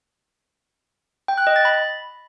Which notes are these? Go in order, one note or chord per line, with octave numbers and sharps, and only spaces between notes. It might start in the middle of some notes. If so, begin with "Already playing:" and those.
G5
F#6
D#5
A6
B5